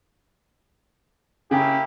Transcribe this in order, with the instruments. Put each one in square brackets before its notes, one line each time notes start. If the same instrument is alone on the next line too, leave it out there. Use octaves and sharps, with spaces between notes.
[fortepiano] C#3 [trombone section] A#3 E4 G4